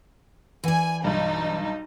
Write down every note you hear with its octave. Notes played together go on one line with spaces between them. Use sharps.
E3 D5 G#5
B1 G2 D#4